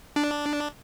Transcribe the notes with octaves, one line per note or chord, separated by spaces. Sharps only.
D4